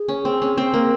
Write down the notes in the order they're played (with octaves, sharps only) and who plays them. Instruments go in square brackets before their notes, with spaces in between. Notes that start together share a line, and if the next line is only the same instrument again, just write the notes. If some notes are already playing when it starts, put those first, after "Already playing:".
Already playing: [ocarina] G#4
[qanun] C#4
C4
C#4
C4
A#3